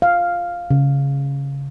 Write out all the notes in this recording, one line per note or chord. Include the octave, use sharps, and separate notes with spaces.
F5
C#3